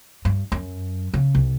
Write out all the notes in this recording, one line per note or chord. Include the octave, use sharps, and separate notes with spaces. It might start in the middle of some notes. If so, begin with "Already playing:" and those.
G2
F#2
C#3
C2